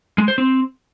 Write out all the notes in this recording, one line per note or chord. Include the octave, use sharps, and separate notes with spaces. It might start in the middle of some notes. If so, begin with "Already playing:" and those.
G#3
C5
C4